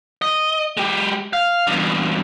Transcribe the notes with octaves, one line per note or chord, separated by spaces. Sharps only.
D#5
G#3 G4
F5
E2 G2